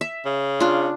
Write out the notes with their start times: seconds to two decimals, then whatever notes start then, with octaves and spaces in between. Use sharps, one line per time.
0.01 E5
0.25 C#3
0.60 D4 F4